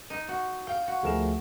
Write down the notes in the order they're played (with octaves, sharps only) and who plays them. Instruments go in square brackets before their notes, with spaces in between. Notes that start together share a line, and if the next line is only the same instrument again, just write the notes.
[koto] D#4
F#4
[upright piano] F5 [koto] G5
[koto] F#4
[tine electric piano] D2 F3 A3 [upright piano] G#4 A#4 E7